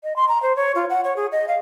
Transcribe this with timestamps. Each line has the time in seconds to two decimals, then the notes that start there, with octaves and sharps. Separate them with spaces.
0.03 D#5
0.16 C6
0.28 A#5
0.42 C5
0.56 C#5
0.75 F4
0.90 F#5
1.04 C#5
1.16 G#4
1.32 D#5
1.48 F5